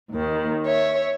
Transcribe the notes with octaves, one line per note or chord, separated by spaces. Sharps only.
D#2 D#3
C#5 E5